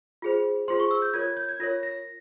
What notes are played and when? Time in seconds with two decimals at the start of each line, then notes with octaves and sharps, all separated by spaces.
0.22 F4 G#4 C5
0.68 F4 G#4 C5 C6
0.80 C#6
0.91 E6
1.02 G6
1.14 F4 A#4 C#5 G#6
1.37 G6
1.49 G#6
1.60 F4 A#4 C#5 A#6
1.83 A#6